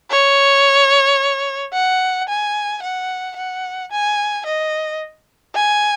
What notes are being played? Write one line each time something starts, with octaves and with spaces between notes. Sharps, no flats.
C#5
F#5
G#5
F#5
F#5
G#5
D#5
G#5